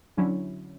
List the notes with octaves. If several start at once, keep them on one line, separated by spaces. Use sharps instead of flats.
D3 F#3 C#4 E4